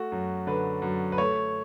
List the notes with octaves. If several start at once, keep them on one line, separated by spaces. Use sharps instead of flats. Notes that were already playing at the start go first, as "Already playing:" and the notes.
Already playing: A3 F#4
F#2
D3 B4
F#2
B4
A3 C#5